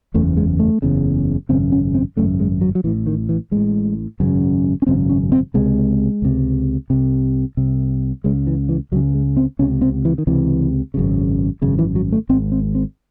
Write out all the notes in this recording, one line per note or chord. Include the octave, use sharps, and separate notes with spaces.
F#1 E2 C#3 A3
G#3
A3
F#1 E2 C#3
G#1 F#2 C#3 C4
C#4
C4
G#1 F#2 C#3 A3
G#3
F#3
F#3
A1 A2 E3
D#3
E3
A1 A2 G#3
G#1 F#2 C#3
C#4
G#1 F#2 C#3 C4
C#4
C4
C#2 C3 G#3
C#2 C3
C2 C3
C2 C3
C#2 C#3 G#3
E3
E3
C#2 C#3 F#3
G#3
C4
C#2 C3 C#4
C4
E3
D#3
C#2 C3 E3
G#1 F#2 C#3
G#1 F#2 C#3
E3
F#3
A3
G#1 G#2 C4
C4
C4